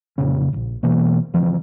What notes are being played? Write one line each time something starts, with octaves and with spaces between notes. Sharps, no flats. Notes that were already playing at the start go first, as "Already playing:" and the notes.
F1 A#2 C#3 C#4
E1 A#1
B2 E3 A#3
C#3 E3 F3 C4